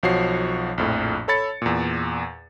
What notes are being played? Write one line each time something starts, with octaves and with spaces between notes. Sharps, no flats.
B1 F3 F#4 C#5 C7
A#1 F2 A2
A4 C#5 B5 A6 C#7
E2 A#2